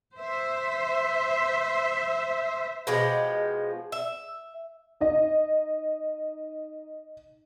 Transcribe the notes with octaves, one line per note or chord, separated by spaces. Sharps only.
C5 E5
B2 F3 G#3 G4
E5
D#4 D#5